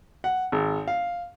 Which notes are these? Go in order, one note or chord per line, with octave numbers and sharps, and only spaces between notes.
F#5
G#1
F5